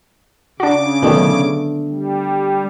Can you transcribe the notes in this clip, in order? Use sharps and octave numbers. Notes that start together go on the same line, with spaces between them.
C#3 D4 F#4 D6
B2 D3 D#3 F#3 A3 B3
G3